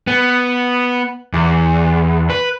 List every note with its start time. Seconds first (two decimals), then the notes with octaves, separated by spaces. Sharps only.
0.07 B3
1.33 E2
2.30 B4